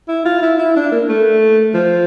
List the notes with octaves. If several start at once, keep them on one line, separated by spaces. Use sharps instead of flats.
E4
F4
E4
E4
D4
A#3
A3
F3